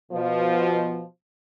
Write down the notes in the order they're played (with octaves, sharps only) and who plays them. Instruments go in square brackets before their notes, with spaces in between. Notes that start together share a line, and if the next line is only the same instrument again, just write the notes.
[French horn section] B2 F3